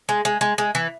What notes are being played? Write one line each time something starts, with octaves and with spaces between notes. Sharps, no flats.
G#3
G#3
G#3
G#3
E3